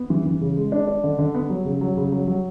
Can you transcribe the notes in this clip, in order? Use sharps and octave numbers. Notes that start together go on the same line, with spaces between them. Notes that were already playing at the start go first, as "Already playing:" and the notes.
Already playing: B3
E3
E3
C#3
G#3
D4
D4
D3
D3
B3
F#3
C#3
F#3
C#3
F#3
F#3